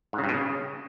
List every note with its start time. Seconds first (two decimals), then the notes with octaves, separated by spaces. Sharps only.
0.13 G#2
0.18 C#3
0.24 G2
0.29 B2
0.34 C#3